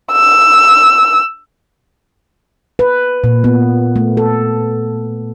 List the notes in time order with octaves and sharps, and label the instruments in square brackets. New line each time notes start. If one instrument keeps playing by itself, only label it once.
[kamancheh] E6
[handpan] B4
A#2
B3
A3
A4